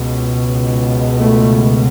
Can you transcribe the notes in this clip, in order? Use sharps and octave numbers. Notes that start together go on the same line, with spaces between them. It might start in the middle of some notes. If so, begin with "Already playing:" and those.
Already playing: C#2 B2
A3